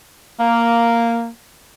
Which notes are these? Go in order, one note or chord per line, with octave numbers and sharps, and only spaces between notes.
A#3